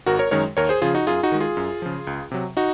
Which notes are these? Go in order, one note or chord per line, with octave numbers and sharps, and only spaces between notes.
G#1 F#4 A#4
A#4 C#5
F#2 D#3 G#3 A#4 C#5
D#2 A#4 C#5
G#4 C5
C#3 F3 F4 G#4
D#4 F#4
F#2 F4 G#4
D#4 F#4
D#3 G#3
F4 G#4
F#2
C#3 F3
C#2
C3 F#3
D#4 F#4